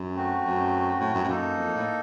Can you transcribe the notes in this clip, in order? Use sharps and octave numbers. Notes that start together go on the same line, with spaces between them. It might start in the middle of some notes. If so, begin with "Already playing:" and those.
Already playing: F#2
A3 C4 F#4
F#2
A2
F#2
A2
F#2 A#3 D#4 A4
F2
A2